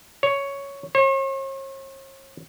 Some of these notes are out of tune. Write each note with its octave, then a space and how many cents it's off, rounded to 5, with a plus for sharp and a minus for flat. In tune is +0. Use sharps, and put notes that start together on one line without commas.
C#5 +5
C#5 -45